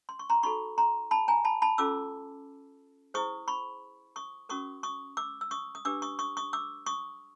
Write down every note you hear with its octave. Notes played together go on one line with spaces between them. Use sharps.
C6
C#6
A#5 C6
D#4 F#4 A4 B5 C#6
A#5 C6
A5 B5
G#5 A#5
A5 B5
A5 B5
C#4 F4 A4 D6 E6
E4 G#4 C5 C#6 D#6
B5 C#6
C#6 D#6
C#4 F#4 A#4 C#6 D#6
C#6 D#6
D6 E6
E6
C#6 D#6
D#6
D4 G4 B4 D6 E6
C#6 D#6
C#6 D#6
C#6 D#6
D6 E6
C#6 D#6